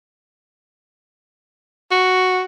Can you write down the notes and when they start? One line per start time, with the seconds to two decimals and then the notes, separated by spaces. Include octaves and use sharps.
1.91 F#4